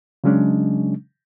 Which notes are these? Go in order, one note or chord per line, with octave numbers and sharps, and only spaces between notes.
C#3 F#3 G#3 C#4 D4